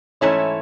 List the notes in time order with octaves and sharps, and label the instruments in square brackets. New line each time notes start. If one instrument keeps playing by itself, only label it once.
[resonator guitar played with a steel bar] G#2 E3 A3 C#4 E4 [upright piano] C#5